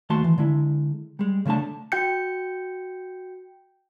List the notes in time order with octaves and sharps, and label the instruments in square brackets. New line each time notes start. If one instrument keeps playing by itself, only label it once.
[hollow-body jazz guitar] D#2 A3 F#4 A5 C6
E3
D3 G#3 E4
G3 G#3
C#3 G#3 A3 D4 A5
[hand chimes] F#4 G5 G6 C#7